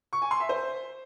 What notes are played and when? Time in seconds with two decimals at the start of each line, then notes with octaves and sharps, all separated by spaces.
0.13 C#6
0.22 G#5
0.31 C6
0.40 E5
0.49 C5